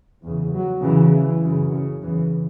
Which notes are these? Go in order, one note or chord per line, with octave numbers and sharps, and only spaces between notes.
E2 C#3
F#3
E2 C#3 E3
E3
F#2 C#3
C#3
E2 C#3 E3